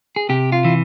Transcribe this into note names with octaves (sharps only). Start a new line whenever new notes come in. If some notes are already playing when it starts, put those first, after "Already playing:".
G#4
C3 G4
F4
E3